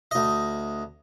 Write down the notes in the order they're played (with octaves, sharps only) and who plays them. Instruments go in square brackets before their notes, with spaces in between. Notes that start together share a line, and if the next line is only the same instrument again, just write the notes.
[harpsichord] D2 D#5